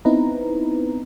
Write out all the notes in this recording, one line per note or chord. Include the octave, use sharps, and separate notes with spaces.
B3 C4 D#4 E4 B4 A#5